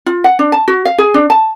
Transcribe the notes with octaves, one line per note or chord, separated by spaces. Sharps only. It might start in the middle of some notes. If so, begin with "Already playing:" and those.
F4
F#5
D4
A5
F#4
F5
G#4
D4
A5